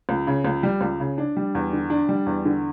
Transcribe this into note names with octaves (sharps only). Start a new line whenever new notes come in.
C#2
C#3
C#2
G3
C#2
C#3
D4
G3
E2
D3
D4
G3
E2
D3